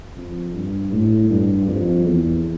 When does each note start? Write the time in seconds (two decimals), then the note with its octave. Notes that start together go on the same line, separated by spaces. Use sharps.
0.16 F2
0.54 G2
0.92 A2
1.30 G2
1.68 F2
2.05 E2